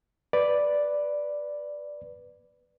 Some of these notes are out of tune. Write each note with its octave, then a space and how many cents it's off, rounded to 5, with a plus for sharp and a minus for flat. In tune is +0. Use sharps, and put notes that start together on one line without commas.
B4 +0 D5 +0